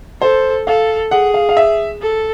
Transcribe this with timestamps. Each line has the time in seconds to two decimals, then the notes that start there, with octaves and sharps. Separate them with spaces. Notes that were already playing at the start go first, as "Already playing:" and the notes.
0.22 A4 C5
0.67 A4 F5
1.11 G#4 F#5
1.34 F5
1.49 F5
1.57 E5
2.02 A4